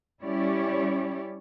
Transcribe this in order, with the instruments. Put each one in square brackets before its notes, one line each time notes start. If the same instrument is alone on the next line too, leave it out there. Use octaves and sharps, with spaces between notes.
[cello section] G3 C#4 E4 G4 C#5 D5